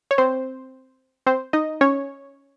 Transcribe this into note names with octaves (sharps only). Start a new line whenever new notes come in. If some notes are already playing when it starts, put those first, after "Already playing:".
C#5
C4 C5
C4 C5
D#4 D#5
C#4 C#5